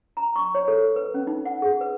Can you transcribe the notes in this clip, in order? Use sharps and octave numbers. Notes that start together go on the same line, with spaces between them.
A#5
C#6
C#5
A4
B4
C#4
D#4
F#5
G#4
B4